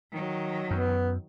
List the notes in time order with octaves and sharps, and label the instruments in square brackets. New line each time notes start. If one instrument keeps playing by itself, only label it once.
[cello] D#3 F#3
[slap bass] F#2 [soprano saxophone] B3